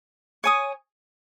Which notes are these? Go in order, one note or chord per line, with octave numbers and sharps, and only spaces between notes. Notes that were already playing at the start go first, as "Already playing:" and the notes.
C#5 G#5 D#6